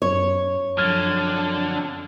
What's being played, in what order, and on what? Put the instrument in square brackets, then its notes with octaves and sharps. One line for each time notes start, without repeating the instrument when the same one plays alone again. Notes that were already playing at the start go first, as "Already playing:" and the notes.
[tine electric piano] F#2 [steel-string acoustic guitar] C#5
[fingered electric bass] F#2 F3 [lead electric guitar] D3 [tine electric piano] F6 G#6